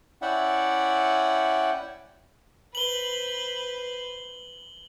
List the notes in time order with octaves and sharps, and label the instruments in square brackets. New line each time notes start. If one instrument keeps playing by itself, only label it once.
[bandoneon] C#4 E4 D5 E5 F#5 G5
[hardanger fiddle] B4 C5 [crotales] F#7 G7